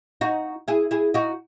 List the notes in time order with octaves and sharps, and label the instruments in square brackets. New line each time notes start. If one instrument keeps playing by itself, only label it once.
[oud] D#4 F#4
E4 G#4
E4 G#4
D#4 F#4